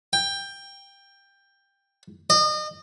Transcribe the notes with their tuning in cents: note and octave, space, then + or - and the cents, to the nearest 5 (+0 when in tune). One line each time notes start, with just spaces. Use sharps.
G5 +15
D#5 -35